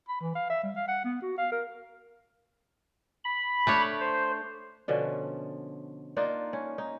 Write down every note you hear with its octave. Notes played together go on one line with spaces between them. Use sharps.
B5
E3
F5
E5
G3
F5
F#5
B3
F#4
F5
A#4
B5
A3 D4 C#5
C5
B2 D3 F3 C#4
A#3 D4 D#4 F4
C#4
D#4